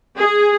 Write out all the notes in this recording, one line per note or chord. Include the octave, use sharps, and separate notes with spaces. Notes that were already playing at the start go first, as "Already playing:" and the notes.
G#4